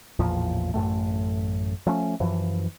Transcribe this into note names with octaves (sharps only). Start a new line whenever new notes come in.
A1 E2 A#2 F3
A1 F#2 A2 A3
F3 A3 C#4
F#2 E3 F3